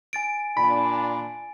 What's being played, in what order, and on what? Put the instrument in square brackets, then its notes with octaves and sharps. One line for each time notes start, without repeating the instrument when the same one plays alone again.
[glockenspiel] G#5 A6 D7
[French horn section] A#2 D4 [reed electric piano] B5